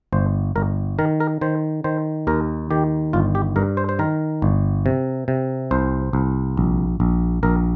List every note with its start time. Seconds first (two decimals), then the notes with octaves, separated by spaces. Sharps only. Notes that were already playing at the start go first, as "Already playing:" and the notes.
0.13 G1 C5
0.56 G1 A#4
0.99 D#3 A#4
1.20 A#4
1.41 D#3 C5
1.84 D#3 C5
2.27 D#2 A#4
2.71 D#3 G4
3.13 G1 F4
3.35 G4
3.56 G2 A#4
3.77 C5
3.89 C5
3.99 D#3 A#4
4.42 G1
4.86 C3
5.28 C3
5.71 C2 C5
6.13 C2
6.57 A#1
7.00 A#1
7.43 A#1 A#4